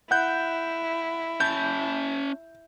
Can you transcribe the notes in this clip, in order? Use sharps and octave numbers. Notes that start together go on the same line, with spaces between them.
E4 F#5 F#6 G6
C#4 A5 G6